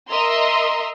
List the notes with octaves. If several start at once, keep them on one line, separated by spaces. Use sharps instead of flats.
A#4 D#5 E5 A#5 C6